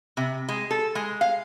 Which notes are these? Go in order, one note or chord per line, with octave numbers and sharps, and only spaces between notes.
C3
G#3
A4
G#3
F5